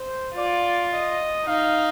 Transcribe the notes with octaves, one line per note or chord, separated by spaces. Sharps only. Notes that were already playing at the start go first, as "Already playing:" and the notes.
Already playing: C5
F4 D5
D#5
D#4 F5